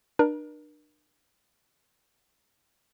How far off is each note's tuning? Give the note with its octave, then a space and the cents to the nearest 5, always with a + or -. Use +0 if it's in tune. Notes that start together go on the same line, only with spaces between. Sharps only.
D4 +35 A#4 +40